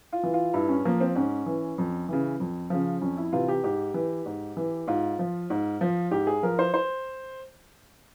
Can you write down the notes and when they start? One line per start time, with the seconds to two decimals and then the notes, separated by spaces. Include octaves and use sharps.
0.13 F4
0.23 E3
0.34 F4
0.54 G2 E4
0.69 C#4
0.85 F3 A#3
1.00 C4
1.15 G#2 C#4
1.46 E3
1.78 F2
2.09 C#3 E3
2.40 F2
2.70 C#3 F3
3.01 F2 C#4
3.17 E4
3.32 C3 E3 F4
3.48 G4
3.63 G#2 G4
3.94 E3
4.25 G#2
4.57 E3
4.87 G#2 F4
5.19 F3
5.50 G#2
5.81 F3
6.11 G#2 G4
6.27 G#4
6.43 F3 A#4
6.59 C5
6.74 C5